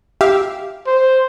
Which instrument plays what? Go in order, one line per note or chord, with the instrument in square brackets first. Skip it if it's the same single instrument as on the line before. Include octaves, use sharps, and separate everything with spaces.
[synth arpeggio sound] G4 E5 F5
[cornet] C5